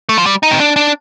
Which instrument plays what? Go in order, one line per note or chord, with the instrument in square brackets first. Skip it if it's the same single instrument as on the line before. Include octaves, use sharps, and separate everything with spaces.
[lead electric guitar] A3
F3
G3
D#4
C4
D4
D4